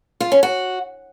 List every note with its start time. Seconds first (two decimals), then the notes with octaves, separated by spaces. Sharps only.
0.20 F4
0.32 C#4
0.43 F#4